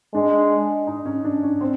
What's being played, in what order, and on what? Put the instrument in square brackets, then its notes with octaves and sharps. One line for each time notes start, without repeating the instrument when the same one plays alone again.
[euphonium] G#3 [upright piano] D4
[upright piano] D#4
C#4
D4
C#4
C4